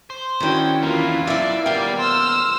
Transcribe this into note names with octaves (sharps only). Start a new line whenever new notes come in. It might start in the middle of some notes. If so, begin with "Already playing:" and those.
C5
D#3 C#4 D4 E4 F#4 G5
E2 A#3 F4 B4
B1 E4 D5 E5
D#2 B2 G3 G4 A#4 D5 F5
C5 E6 F6